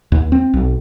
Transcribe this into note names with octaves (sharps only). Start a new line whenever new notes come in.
D#2
C4
B1